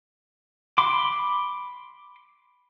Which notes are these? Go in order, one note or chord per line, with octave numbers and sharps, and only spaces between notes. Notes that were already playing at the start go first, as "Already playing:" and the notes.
B5 C6 D6